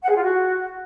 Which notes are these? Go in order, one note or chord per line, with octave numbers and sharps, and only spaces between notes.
F#5
G#4
F4
F#4